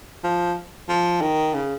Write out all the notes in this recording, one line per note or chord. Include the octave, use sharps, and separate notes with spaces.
F3
F3
D#3
C#3